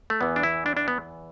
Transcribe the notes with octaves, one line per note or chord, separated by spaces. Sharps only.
A3
E2 E3 B3
D4
E4
D4
D4
B3